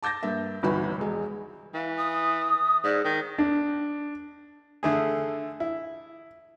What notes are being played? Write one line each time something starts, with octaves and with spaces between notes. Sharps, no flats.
A5 D6 G6 A6 A#6
G2 A#3 E5
G1 C2 D#3 E3 F#4 B5
E1 G#3
E3 F5
D#6
G#2 D5
D#3 D#4
D4
D3 A3 G#4
E4